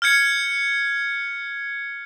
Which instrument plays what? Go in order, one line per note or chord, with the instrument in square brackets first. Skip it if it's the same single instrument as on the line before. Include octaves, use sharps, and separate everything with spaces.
[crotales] F6 G6 G#6 C#7